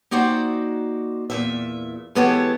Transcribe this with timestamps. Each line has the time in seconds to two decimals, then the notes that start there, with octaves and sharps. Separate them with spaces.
0.11 A#3 D#4 F#4 C5 D5 G5
1.30 E2 A#2 E5
2.15 E3 G#3 B3 G4 A4 C#5